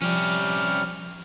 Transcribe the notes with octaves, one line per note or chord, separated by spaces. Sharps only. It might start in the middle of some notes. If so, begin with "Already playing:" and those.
C3 F3 G3 C#4 G4 F6